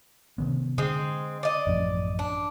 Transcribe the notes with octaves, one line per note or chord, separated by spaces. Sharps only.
C3 D#3 B3
D3 G#3 C4
D5 D#5
A1 F#2 F3
D4